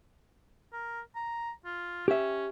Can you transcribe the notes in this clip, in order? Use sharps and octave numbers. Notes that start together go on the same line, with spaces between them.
A#4
A#5
F4
C#4 G4 E5